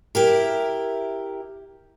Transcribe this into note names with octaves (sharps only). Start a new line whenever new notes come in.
E4 G4 A#4